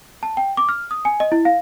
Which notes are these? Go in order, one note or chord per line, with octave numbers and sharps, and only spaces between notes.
A5
G5
D6
F6
D#6
G#5
D#5
E4
F5